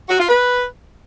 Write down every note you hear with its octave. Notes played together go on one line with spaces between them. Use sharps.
F#4
F4
B4